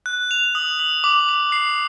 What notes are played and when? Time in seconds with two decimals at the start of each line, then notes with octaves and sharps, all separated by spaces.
0.06 F#6
0.31 F7
0.55 D#6
0.79 D#6
1.04 D6
1.29 D6
1.52 C7